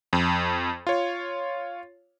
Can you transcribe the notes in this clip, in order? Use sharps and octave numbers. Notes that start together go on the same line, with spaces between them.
F2
F4 C#5